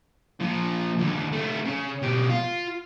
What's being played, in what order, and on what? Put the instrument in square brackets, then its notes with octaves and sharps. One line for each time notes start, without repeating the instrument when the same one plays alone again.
[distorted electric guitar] A#2 F3
D#2 D3
A3 C4
C#3
B2 G4
F4